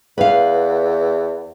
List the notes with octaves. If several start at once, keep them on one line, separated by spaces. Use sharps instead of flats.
E2 B4 F5